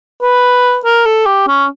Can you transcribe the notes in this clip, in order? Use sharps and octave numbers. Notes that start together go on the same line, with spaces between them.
B4
A#4
A4
G4
C#4